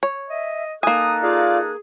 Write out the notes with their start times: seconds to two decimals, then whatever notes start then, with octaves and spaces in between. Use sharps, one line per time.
0.03 C#5
0.29 D#5 E5
0.83 A#3 D#4 A4 G#5 D#6 F#6
1.23 F4 G#4 D5 F5